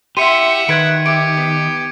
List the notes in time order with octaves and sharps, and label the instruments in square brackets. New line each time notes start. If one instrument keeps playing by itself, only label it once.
[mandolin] E4 C6 [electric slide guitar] G4 [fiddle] E5 F#5 [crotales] C#7 D#7
[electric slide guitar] D#3 [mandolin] B4 F#6 [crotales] G#6 D7
[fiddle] G4 [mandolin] E5 D6 [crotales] D7
[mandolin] B3